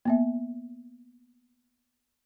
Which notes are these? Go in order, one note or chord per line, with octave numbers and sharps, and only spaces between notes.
A#3 B3 E5